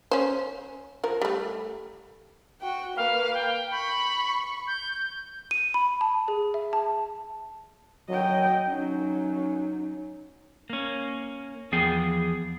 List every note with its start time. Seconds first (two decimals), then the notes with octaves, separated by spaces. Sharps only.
0.11 C#4 C5
1.04 F3 A#4
1.21 G3 A3
2.61 F#4 G5
2.96 A#3 B4 F5
3.34 G5
3.71 B5 C#6
4.67 G6
5.51 D#7
5.74 B5
6.01 A5
6.28 G#4
6.54 E5
6.73 A5
8.09 F#3 D#5 G5
8.68 F#3 C#4 D#4
10.70 A#3 C#4
11.72 E2 F3 B3 G#4 G5